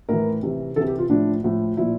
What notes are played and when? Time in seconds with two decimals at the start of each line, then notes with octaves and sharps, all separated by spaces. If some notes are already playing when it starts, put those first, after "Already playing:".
0.09 A2 E3 A#4
0.43 C3 E3
0.76 C3 E3 A4
0.87 G4
0.99 F4
1.10 A2 F3 D4
1.44 A2 F3
1.77 A#2 F3 E4